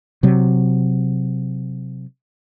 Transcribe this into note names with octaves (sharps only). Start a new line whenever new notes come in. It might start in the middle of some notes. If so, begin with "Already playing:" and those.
C3 F#3